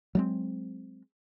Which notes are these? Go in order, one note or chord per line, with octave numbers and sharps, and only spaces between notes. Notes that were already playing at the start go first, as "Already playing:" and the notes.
F#3 G#3 C4